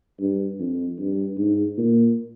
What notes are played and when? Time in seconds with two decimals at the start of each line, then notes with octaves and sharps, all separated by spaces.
0.20 G2
0.59 F2
0.98 G2
1.37 G#2
1.77 A#2